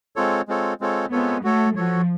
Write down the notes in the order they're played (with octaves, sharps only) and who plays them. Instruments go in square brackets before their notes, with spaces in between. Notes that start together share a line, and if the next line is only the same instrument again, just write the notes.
[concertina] G#3 C4 F4 A4 C#5
G#3 C4 F4 A4 C#5
G#3 C4 F4 A4 C#5
[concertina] G#3 C4 F4 A4 C#5 [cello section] B3
[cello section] A3 [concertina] F#4 A4 C#5
[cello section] F3 [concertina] F#4 A4 C#5